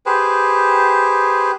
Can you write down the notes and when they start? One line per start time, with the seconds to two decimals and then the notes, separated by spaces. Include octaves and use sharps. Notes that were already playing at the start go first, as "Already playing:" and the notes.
0.06 G4 G#4 B4 C5